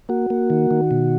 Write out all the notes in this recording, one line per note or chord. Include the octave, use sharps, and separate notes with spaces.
A#3 F#4
A#3
D#3
D#3
B2